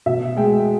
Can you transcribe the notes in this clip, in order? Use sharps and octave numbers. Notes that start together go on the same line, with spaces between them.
B2 E5
G#3 G5